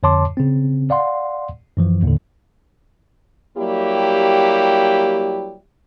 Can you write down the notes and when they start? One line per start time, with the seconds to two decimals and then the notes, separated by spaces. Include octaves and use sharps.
0.03 F2 D3 C#5 A5 C6 D6
0.37 C#3 C4
0.90 D5 F5 F#5 C6
1.77 F#2 E3 F3
2.03 D#2 A2 D3
3.57 F#3 G3 A#3 E4 G4